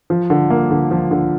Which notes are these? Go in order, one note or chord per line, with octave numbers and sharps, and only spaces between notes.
F3
D3
A#3
D3
F3
D3